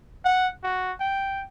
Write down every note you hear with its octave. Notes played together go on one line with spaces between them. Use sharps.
F#5
F#4
G5